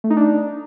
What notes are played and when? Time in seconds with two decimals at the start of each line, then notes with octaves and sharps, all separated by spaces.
0.04 A3
0.10 D#4
0.17 D4